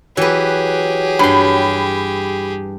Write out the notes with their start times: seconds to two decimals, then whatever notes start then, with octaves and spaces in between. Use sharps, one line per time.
0.17 E3 F#3 G4 G#4 B4
1.19 G2 B5 C6